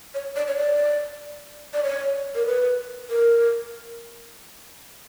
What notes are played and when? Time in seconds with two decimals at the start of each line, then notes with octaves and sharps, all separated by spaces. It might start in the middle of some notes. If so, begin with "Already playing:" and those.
0.14 C#5
0.36 D5
0.47 C#5
0.57 D5
1.74 D5
1.84 C#5
2.35 A#4
2.47 B4
3.10 A#4